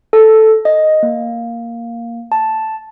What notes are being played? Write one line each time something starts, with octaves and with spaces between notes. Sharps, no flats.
A4
D#5
A#3
A5